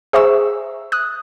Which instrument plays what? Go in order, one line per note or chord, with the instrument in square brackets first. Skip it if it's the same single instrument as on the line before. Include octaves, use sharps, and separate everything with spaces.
[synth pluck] G#4 C5 E5 A#5 C#6 E6
D#6 F#6